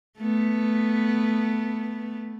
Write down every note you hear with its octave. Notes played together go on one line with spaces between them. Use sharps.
A3 B3